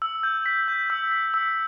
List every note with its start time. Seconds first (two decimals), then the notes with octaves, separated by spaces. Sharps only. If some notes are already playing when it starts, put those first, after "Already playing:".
0.02 E6
0.23 G6
0.46 B6
0.68 G6
0.90 E6
1.12 B6
1.34 E6